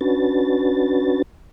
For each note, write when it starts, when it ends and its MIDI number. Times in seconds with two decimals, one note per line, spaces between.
0.01 1.22 61
0.01 1.22 62
0.01 1.22 66
0.01 1.22 71
0.01 1.22 93